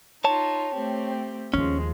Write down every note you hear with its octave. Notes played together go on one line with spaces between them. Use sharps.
D#4 F4 C#5 A5
A3 C4 G4
D#2 F3 G#3 C#4